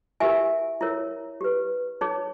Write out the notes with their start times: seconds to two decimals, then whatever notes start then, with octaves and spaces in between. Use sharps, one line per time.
0.20 E4 G4 A#4 E5 G#5
0.81 E4 A#4 C#5
1.41 G4 B4
2.01 D#4 G#4 C#5